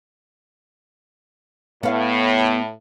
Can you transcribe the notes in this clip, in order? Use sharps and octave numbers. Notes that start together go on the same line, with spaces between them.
A2 B3 F5